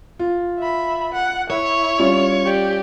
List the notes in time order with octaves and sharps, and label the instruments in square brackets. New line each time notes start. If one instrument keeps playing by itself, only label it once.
[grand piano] F4
[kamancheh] E5 B5
F#5
[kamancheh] E4 [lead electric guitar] C#5
[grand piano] G3 C#4 F4
[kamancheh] G4 D5